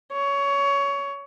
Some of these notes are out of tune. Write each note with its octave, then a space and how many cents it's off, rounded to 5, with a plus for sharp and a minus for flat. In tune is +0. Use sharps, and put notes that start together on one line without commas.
C#5 +20